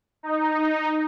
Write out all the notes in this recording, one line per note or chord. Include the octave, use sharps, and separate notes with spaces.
D#4